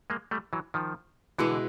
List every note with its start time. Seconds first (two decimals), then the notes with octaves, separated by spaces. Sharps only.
0.10 G#3 A#3
0.31 G3 A3
0.53 E3 F#3
0.74 D#3 F3
1.39 B2 D3 E3 G#3 B3 E4